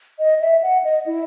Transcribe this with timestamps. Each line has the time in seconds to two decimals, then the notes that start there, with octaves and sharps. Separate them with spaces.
0.19 D#5
0.41 E5
0.63 F#5
0.84 D#5
1.06 E4